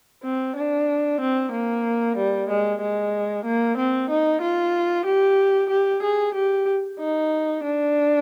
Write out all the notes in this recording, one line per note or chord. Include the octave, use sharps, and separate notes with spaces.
C4
D4
C4
A#3
G3
G#3
G#3
A#3
C4
D#4
F4
G4
G4
G#4
G4
D#4
D4